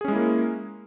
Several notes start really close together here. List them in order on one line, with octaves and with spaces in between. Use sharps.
G#4 C#4 G#3 E4 A#3